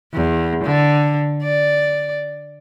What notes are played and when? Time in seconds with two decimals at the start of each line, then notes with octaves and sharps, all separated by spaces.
0.13 E2
0.64 D3
1.43 D5